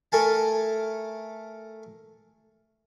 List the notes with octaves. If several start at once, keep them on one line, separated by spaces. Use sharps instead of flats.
A3 A4 A#4 G#5 A5